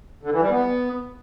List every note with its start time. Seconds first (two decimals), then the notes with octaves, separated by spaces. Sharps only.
0.23 D3
0.32 E3
0.41 G3
0.50 B3